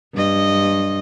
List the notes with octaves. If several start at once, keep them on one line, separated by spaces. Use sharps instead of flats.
G2 D#5